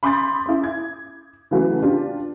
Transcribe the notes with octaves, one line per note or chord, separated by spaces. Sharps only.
B5 C6 D6 D#6 G6 A6
C#4 E4
G#6
C#3 E3 F#3 A3 F#4 B4
D4 F4 G4